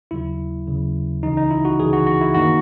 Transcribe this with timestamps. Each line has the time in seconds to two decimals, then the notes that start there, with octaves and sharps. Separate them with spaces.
0.11 D#2 C#3 F#3 E4
0.67 D#2 C#3 F#3
1.23 C#2 C#3 E3 D#4
1.37 D#4
1.51 E4
1.65 F#4
1.79 C#2 C#3 E3 G#4
1.93 F#4
2.07 F#4
2.21 E4
2.34 F#2 D#3 A#3 D#4 F#4